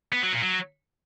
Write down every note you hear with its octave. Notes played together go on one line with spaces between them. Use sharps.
B3
F#3
A#2
F#3